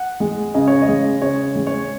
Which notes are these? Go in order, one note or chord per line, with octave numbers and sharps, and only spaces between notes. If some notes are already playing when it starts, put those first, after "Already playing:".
Already playing: F#5
G#3
C#3 D#5
C#5
D#5
G#3
C#3 C#5
G#3
C#5